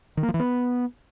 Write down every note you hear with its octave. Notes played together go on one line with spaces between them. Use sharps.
D#3
A#3
F3
E3
B3